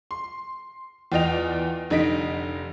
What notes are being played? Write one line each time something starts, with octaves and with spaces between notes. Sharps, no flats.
C6
E2 F4 D5 D#5 G5 F7
F1 D3 D#4 D#5 B6 D7